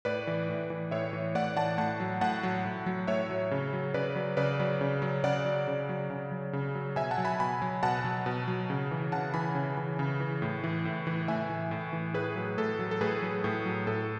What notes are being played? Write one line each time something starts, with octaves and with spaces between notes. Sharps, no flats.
A2 B4 D5
E3
A2
E3
A2 C#5 E5
E3
A2 D5 F#5
E3 F#5 A5
A2 F#5 A5
F#3
A2 F#5 A5
F#3
A2
F#3
A2 C#5 E5
F#3
C#3
F#3
C#3 B4 D5
F#3
C#3 B4 D5
F#3
C#3
F#3
C#3 D5 F#5
F#3
C#3
F#3
C#3
F#3
C#3
F#3
B2 E5 G#5
F#5 A5
F#3
G#5 B5
B2 G#5 B5
F#3
B2 F#5 A5
F#3
B2
F#3
C#3
E3
C#3 F#5 A5
E3 G#5 B5
C#3
E3
C#3
E3
A2
E3
A2
E3
A2 E5 G#5
E3
A2
E3
A2 G#4 B4
F#3
A2 A4
F#3
A4
A2 G#4 B4
F#3
A2
F#3
A2 A4